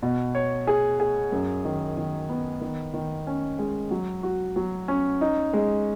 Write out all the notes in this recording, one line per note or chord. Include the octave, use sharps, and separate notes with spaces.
B2
C#5
G#4
G#4
F#2
D#3
D#3
B3
D#3
D#3
C#4
G#3
F#3
F#4
F#3
C#4
D#4
G#3